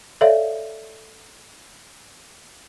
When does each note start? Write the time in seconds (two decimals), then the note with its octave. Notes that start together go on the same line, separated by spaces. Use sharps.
0.21 A4 C#5 D5 E5 F5